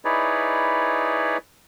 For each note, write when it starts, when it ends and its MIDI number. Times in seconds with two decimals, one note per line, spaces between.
0.05 1.37 63
0.05 1.37 64
0.05 1.37 68
0.05 1.37 71
0.05 1.37 73
0.05 1.37 74